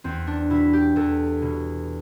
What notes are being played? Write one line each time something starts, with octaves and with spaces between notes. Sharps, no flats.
E2 C4
D4
B2 E4
G4
E2 A4
B2